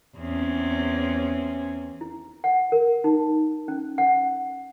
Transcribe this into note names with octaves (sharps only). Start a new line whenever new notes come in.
E2 C4 C#4
E4
F#5
A#4
D#4
C#4
F#5